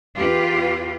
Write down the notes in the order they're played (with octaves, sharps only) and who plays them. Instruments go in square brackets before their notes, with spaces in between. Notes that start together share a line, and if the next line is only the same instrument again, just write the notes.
[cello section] E2 F4 G4 B4